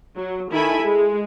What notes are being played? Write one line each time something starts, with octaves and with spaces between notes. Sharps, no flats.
F#3
D#3 E4 A4 E5 G#5 B5
G#3